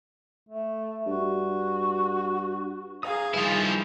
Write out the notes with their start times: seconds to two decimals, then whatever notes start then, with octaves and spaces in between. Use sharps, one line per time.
0.49 A3
1.07 G2 F#4
3.03 G#4 F5 G#5 A#5 D#6
3.34 D#3 F3 G3 E4 B4